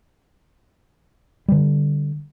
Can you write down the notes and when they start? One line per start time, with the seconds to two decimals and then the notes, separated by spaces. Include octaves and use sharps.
1.48 D3 G3